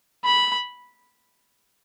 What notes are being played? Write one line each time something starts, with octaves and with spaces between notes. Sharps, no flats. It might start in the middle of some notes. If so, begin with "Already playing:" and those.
B5